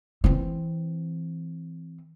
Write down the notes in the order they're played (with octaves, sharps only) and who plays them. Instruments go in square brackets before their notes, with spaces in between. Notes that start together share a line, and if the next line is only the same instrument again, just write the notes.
[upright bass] E3 C4